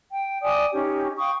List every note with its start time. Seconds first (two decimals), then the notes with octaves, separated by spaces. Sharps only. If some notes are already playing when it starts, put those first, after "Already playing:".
0.11 G5
0.42 D5 G5 G#5 D#6
0.73 C#4 D#4 G4
1.18 F5 G5 C#6 D#6